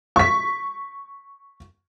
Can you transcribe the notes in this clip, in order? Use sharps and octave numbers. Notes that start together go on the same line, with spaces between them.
C#6 B6